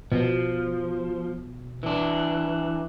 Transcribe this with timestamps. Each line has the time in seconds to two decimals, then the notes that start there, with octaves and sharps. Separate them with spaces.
0.12 B2 F3
1.83 E3 D4